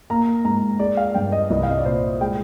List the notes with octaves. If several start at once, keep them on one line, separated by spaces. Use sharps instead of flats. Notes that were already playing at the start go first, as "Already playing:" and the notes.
A#3 A#5
G#2 A#5
G#3 D5
F5
G2 G5
D#5
C2 D#5
F5
D#5
D5
A#2 C5
G#3 G5